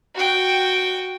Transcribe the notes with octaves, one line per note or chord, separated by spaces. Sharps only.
F#4 G5